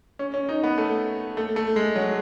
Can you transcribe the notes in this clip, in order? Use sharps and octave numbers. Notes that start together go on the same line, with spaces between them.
C#4
C#4
D#4
B3
A3
A3
A3
G#3
F#3